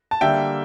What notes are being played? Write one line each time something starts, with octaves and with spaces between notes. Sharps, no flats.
A5
D3 G3 A#3 E5 G5